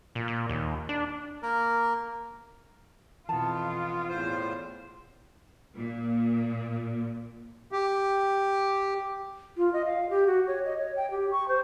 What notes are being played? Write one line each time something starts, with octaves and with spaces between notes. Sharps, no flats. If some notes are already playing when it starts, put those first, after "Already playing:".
A#2
A#2
D#2
D4
A#3 A#4
F2 B2 E3 B3 F4 A5
E2 A2 C5
A#2
G4
F4
D#5
F5
G4
F#4
C#5
D#5
C#5
G5
G4
C#6
C5